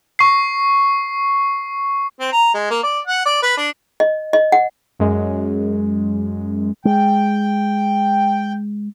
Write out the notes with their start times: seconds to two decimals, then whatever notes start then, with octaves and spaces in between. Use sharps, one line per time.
0.19 C#6 C7
2.20 C4
2.32 A#5
2.54 G#3
2.70 A#3
2.83 D5
3.07 F#5
3.25 D5
3.43 B4
3.57 D4
4.00 D#5
4.33 D#5
4.52 F#5
4.99 F#2 G#3
6.85 G#3 G5